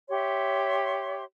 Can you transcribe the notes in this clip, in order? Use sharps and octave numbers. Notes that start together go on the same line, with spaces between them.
G4 C#5 E5 C6